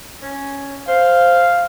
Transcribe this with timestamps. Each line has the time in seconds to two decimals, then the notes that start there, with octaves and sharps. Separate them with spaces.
0.22 C#4
0.88 C5 F5